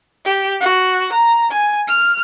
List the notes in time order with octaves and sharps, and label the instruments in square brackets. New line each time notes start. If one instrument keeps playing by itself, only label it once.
[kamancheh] G4
F#4
A#5
G#5
F6